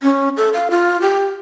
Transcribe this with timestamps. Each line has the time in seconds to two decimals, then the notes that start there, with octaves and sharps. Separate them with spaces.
0.03 C#4
0.37 A4
0.53 F5
0.70 F4
1.01 G4